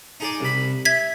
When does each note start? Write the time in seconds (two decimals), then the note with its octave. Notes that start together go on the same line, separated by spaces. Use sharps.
0.20 D#4 G#4 D5
0.40 C2 B5
0.85 E5 G#6 B6